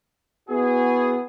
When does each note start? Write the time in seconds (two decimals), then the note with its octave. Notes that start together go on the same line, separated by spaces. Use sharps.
0.49 B3 E4 F#4 G#4